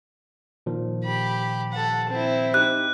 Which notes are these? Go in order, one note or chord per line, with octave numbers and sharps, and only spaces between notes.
A#2 D#3 F3
G4 B5
A4 F#5
C4 E4
D#4 G4 F#6